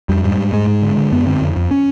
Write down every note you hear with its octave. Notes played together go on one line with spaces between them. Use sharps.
F2 G3
G#2 G3
G#2
G#2 G#3
G#2
D3
D3
F#2 B3
D3 C4
F2
F2
C#4